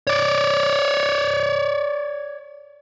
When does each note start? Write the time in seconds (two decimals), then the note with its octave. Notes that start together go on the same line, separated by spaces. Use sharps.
0.07 C#5 D5